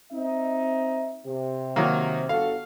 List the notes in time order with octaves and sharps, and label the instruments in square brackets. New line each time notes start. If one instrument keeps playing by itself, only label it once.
[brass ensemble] C4 D#4 E5
C3
[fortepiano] D#3 F#3 A#3
[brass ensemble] G1 F#4 A4 [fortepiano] F5